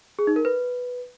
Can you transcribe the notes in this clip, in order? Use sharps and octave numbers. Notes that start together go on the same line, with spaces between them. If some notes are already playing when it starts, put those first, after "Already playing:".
G#4
D#4
A#4
B4